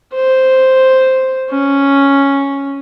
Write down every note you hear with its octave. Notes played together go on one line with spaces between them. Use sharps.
C5
C#4